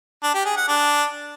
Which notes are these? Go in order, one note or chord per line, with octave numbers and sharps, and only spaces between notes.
D4
G4
G#4
F#5
D4